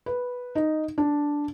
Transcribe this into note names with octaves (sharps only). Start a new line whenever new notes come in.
B4
D#4
D4